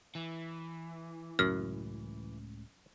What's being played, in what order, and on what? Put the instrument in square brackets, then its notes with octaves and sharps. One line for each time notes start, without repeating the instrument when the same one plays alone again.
[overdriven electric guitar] E3
[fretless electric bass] C#2 A2 C#3 [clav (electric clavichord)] F#2 [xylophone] F6